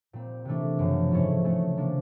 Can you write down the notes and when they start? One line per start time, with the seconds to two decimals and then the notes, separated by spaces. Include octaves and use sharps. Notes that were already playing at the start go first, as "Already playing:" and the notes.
0.13 A#2 G3 C4
0.45 C3 E3 A3 D4
0.79 F#2 C#3 F3
1.11 G#2 F3 A3 C#4 E4
1.44 C#3 E3 A3 C#4
1.76 C3 F3 A#3 D4